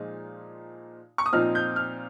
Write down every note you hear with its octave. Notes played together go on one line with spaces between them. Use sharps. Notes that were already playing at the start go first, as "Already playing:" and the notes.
Already playing: A#2 F3 G#3 D#4
C#6
D#6
A#2 F3 C4 D#4 F6
G6
F6